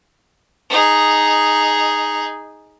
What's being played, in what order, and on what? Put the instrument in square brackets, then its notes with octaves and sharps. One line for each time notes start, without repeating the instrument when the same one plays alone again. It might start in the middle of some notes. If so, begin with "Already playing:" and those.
[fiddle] D#4 G#4